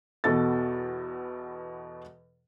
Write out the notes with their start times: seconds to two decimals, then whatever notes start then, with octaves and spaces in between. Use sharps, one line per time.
0.24 E2 B2 A4 A6